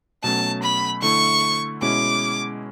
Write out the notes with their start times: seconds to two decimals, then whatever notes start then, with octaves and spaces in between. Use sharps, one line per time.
0.23 B2 F#3 A3 C#4 A5
0.63 B5
1.02 D3 A3 E4 C#6
1.82 B2 G#3 C#4 E4 D6